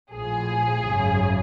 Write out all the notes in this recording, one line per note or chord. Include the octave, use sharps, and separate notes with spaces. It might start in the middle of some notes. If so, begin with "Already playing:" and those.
A#1 A2 F3 G#4
G#1 F#2 C#3